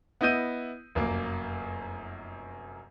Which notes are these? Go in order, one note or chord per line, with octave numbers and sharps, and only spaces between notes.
B3 E4 D#5 G6 D#7
F1 F#2 A#3